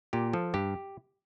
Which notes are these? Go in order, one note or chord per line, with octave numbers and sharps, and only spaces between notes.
A#2 G4
F3 A4
G2 G4